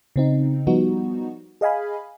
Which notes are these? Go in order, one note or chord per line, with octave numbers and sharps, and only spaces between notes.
C#3 C4 D#4
F3 G3 B3 D#4 F#4
G#4 D#5 F5 G#5 B5